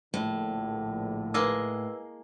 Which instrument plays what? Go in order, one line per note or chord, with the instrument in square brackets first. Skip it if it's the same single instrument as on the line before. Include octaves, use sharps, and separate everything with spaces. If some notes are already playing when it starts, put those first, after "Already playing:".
[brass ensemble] A#1 D3 [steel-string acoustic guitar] A2
[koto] G#3 A#3 D#5 [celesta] B4 E6